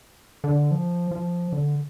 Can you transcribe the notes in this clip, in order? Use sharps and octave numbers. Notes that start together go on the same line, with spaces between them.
D3
F3
F3
D3